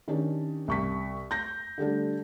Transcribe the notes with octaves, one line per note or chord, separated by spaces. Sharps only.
D#3 C#4 D4 G4
C2 C#6 B6
G6 A#6
D3 G3 A3 D4